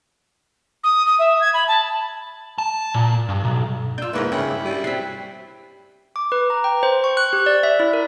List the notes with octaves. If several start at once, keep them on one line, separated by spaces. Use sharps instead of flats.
D#6
D#6
E5
G#6
B5
A5
A5
A#2
G2
B1
D4 F4 E6 G6
E2 G#2 A#3 C#4 E4 B4
G2 C#3 E4 G5
G3
F#3 C4 B6 C7
D6
B4
A#5
G5
C5
C#6
F#6
G4
D5
E5
E4
A#4